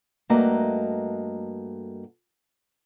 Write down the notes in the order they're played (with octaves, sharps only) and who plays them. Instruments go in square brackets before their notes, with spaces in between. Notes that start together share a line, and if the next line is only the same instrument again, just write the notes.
[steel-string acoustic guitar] G2 A3 A#3 F#4 D#5 A#5